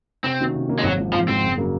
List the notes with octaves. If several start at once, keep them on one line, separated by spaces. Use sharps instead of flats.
C3 C4
D#3 A#3 C#4 F#4
C3
D#3 A#3 C#4 F#4
G#3
G#1 F#3
G#2 F3
G#1 F3
G#2 F3 C4
F#1
C#3 F#3 A#3